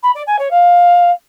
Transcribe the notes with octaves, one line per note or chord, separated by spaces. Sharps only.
B5
D5
G#5
C#5
F5